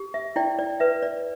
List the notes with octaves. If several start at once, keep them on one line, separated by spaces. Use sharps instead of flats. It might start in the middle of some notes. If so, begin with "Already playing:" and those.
Already playing: G4
E5
E4 D5 G5
D5
B4 E5
D5